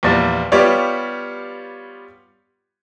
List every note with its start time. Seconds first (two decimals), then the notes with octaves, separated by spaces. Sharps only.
0.03 E2 A#2 F3 G3
0.52 G3 B3 F4 G4 C#5 D5